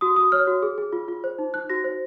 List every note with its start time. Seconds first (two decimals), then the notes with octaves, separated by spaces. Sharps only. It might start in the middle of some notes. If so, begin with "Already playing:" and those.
0.01 F#4 D#6
0.16 F#4 D#6
0.32 C#5 F6
0.47 F#4
0.62 G#4
0.78 G#4
0.93 F4
1.08 F4
1.24 C5
1.39 D#4
1.54 D#4 F#6
1.70 F#4 A#6
1.84 C5